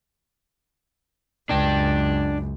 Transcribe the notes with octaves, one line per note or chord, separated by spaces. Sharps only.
C#2 F#2 D4 G5